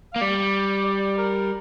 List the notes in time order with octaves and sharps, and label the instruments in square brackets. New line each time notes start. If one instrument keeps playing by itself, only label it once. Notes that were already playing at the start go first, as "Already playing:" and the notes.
[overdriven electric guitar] A#3 [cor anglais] F5
[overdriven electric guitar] G3 [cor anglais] D5
[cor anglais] D5
A#4